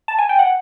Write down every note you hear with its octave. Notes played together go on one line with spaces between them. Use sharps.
A5
G#5
G5
F#5